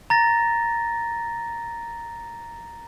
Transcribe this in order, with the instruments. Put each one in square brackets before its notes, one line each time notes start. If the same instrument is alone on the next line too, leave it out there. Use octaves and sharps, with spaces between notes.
[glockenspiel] A#5 A6 A#6